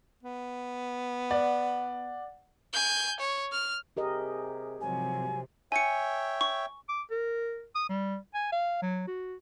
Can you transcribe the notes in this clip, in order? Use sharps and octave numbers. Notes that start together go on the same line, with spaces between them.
B3
D5 F#5
G#5 G6
C#5
F6
C3 G4 G#4 A#4 D#5
G#2 C3 F3 F#3 G#5
C#5 E5 G5 G#5 C#7
C#6
D6
A#4
D#6
G3
G#5
F5
F#3
F#4